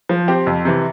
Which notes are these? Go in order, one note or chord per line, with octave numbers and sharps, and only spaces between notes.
F3
C4 G4
F2
C3 E3